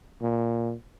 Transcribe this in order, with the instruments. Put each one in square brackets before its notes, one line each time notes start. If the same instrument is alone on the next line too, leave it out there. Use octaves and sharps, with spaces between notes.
[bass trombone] A#2